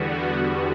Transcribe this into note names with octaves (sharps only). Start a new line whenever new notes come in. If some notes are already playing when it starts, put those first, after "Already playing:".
Already playing: E2 D3 G3 B3 F#4